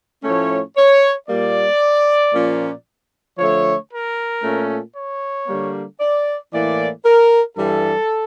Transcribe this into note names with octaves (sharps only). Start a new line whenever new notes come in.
A2 F3 A3 C#4 C#5
C#5
A#2 G3 A#3 D5
A#2 F3 A#3 C#4
D3 F3 A3 C#5
A#4
A#2 A3 C#4
C#5
D3 G3 A#3
D5
A2 E3 A#3 D5
A#4
G2 E3 G3 A4